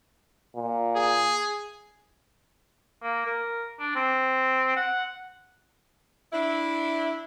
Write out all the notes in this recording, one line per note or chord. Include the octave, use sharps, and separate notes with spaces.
A#2
G#4
A#3
A#4
D4
C4
F#5
D4 E4